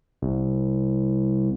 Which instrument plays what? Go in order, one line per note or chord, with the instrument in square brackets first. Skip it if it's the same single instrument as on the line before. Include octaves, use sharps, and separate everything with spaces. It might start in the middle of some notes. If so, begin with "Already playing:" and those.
[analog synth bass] C2